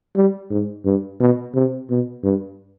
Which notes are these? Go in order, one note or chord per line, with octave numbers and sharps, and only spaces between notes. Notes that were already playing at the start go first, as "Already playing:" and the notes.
G3
G#2
G2
B2
C3
B2
G2